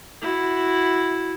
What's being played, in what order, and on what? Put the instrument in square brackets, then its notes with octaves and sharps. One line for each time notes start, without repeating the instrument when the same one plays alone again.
[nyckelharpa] E4 F#4